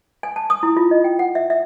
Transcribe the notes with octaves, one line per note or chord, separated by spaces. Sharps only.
G#5
A5
D#6
E4
F4
D#5
G5
F#5
E5
E5